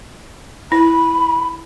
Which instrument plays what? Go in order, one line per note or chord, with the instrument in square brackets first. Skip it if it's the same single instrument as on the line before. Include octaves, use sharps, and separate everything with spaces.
[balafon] E4 [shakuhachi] B5